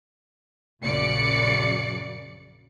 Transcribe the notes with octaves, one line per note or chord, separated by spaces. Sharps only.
A#1 F#2 C#3 D5 C#7